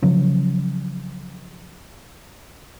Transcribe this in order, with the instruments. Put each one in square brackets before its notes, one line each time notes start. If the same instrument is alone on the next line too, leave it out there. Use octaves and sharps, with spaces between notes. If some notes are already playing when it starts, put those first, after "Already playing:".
[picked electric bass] C#3 F3 F#3